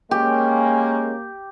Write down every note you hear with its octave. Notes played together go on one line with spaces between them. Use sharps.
G#3 A#3 C#4 G4